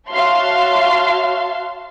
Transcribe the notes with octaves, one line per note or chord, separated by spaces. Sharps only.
F#4 C#5 E5 F5 A5 C6